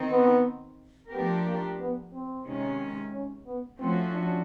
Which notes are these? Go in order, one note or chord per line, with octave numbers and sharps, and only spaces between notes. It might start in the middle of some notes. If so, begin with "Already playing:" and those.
Already playing: D#3 C4 D#4
B3
F3 A3 B3 D4 G4 A#4
A#3
B3
C4
C3 D#3 G#3 C#4
C#4
B3
F3 A3 C4 C#4 F#4
D4